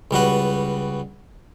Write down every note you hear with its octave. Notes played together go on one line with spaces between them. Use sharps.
C#2 G3 F#4 B4